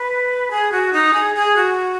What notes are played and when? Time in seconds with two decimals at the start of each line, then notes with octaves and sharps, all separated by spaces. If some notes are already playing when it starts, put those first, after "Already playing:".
Already playing: B4
0.51 G#4
0.72 F#4
0.93 D#4
1.13 G#4
1.36 G#4
1.56 F#4